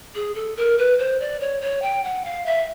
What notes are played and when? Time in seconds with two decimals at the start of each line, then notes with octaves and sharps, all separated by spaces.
0.15 G#4
0.35 A4
0.57 A#4
0.78 B4
0.99 C5
1.20 D5
1.40 C#5
1.61 C#5
1.82 G5
2.04 F#5
2.25 F5
2.46 E5